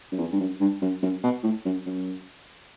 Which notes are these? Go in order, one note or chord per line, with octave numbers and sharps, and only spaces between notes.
F#2
E2
G2
F#2
G2
F#2
F#2
B2
A2
F#2
F#2